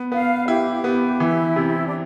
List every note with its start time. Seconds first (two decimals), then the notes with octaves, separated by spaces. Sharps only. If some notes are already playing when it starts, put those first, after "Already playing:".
Already playing: B3
0.12 B3 F5
0.48 E4 G4
0.84 B3
1.20 E3 E4
1.56 C3
1.86 D4